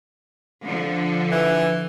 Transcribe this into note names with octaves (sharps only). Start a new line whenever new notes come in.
D3 F3
E3